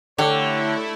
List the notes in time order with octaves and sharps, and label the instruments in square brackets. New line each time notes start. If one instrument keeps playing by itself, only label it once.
[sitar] D3 [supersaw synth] A3 E4 [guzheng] G4 [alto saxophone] C#5